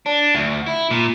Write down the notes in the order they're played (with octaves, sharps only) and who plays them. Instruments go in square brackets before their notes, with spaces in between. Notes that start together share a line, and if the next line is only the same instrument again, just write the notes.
[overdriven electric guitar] D4
D2
E4
A#2